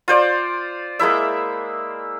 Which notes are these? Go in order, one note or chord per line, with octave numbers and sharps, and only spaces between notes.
F4 C5 D5
G#3 A#3 E4 E5